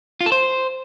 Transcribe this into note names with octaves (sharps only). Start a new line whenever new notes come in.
F4
A4
C5